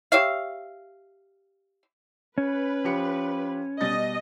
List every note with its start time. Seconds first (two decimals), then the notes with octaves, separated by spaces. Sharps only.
0.12 G4 C#5 E5 F5
2.38 C#4 B4
2.84 F3 G4 C#7
3.81 B2 G3 D#5 A6